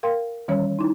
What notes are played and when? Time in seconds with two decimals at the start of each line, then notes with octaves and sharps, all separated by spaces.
0.03 A#4 F5 G5 C6
0.48 D#3 E3 G3 C#4 C#5
0.79 D#4 E4